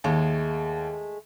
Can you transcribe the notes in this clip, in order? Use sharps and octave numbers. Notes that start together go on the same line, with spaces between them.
D#2 G#3 A3